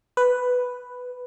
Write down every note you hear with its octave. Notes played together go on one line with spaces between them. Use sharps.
B4